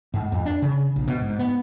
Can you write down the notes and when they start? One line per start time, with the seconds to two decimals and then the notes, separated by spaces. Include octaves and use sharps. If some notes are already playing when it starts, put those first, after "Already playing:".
0.14 G#2
0.32 F2
0.46 D4
0.62 C#3
0.96 A#1
1.08 B2
1.21 G#2
1.39 B3